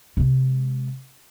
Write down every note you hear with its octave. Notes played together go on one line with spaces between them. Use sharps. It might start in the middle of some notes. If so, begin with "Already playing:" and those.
C3 G#3